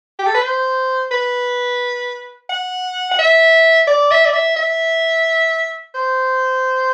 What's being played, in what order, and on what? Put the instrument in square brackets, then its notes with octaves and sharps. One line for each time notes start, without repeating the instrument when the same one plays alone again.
[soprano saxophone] G4
A4
B4
C5
B4
F#5
F#5
E5
D5
E5
D5
E5
E5
C5